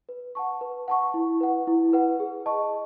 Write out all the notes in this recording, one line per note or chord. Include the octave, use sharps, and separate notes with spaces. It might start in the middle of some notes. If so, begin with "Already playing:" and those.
B4
F#5 A5 C#6
B4
F#5 A5 C#6
E4
B4 F#5
E4
B4 F#5
G#4
D#5 A5 C#6